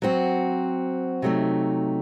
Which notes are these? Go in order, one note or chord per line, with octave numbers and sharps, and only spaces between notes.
F#3 C4 F#4
C3 F#3 A3 D#4